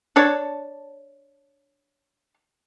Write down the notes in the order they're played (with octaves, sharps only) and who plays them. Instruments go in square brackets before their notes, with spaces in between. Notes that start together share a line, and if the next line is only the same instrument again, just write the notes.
[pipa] D4 C#5 A5